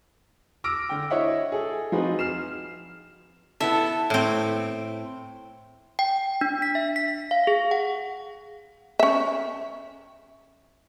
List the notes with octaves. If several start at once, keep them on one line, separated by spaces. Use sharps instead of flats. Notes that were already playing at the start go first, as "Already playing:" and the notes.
D6 E6 F6 A#6 D7
D3 G5
E4 C#5 D#5 E5 F#5
G#4 A4
F3 C4 D#4 F#4 G#4 B4
F6 C7 E7
B3 E4 A4 E5
A2 C4
G5
D4
B6
E5
B6
F5
G#4
F#5
C#4 E5